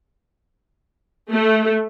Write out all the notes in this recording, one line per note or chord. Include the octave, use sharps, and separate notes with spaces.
A3